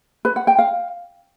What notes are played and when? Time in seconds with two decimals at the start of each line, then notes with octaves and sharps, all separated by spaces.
0.25 B4
0.36 F#5
0.47 G5
0.59 F5